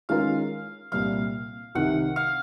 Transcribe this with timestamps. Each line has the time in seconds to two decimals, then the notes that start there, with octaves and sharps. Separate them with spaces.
0.09 D#3 G#3 C#4 F4 A#4 F5
0.92 C2 A#2 G3 F5
1.75 C2 C3 D#3 F#5
2.16 F5